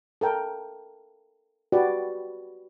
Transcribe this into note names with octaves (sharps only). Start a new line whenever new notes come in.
A4 A#4 G5
F#4 G4 B4 D5